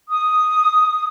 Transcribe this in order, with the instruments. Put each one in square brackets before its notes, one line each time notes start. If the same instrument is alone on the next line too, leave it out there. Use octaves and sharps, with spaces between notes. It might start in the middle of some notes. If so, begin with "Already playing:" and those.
[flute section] D#6